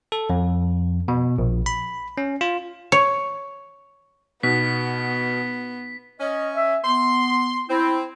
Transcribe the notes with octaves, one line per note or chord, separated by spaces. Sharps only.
A4
F2
B2
A#1
B5
C#4
F4
C#5
B2 B3 D#4 F#4 B6
C#4 D#5
E5
B3 C6
C4 E4